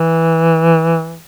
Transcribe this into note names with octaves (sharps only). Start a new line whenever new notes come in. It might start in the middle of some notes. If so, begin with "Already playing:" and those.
Already playing: E3